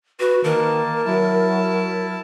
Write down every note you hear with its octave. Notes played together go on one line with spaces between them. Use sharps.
F#4 B4
D#3 A#3 A#4 A5
F#3 E4 A5